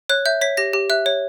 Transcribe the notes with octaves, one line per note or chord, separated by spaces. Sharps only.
C#5 F#6
E5 G6
C#5 B6
G4 A#6
G4
E5 F#6
C#5